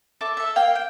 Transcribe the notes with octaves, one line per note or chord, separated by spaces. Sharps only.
A4 E5 D6
A4 E5
A#3 F5 G5
G5